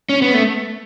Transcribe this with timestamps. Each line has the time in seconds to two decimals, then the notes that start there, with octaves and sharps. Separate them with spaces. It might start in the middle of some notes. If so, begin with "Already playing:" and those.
0.09 C#4
0.22 B3
0.34 A3